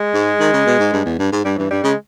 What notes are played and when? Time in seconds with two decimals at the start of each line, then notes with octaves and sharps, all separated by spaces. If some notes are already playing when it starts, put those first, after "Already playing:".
Already playing: G#3
0.14 G#2
0.40 D#3
0.53 C#3
0.66 B2
0.79 G#2
0.93 G2
1.05 E2
1.19 G2
1.32 G#2
1.45 G2 G3
1.57 G2 E3
1.71 G2 G3
1.84 C#3 G#3